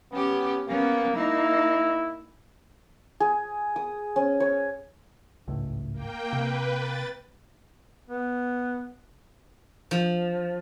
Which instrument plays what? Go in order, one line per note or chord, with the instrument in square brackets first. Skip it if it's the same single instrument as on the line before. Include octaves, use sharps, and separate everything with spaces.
[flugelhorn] B3 [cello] C#4 G4
[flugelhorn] A#3 [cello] B3 C#4
[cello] A#3 D#4 [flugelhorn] E4
[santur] G#4
D#6
C#4
C#5
[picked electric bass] G#1 C#2 A2
[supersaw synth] A#3 G5
[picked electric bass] C3 [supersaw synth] B4
[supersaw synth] A6
[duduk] B3
[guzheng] F3